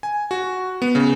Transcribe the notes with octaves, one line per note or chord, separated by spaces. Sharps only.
G#5
F#4
B3
C#3